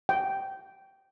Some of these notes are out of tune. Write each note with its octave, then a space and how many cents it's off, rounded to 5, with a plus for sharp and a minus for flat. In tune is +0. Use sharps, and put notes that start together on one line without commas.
G5 -15